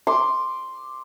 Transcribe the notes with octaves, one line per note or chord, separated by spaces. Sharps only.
C6 D6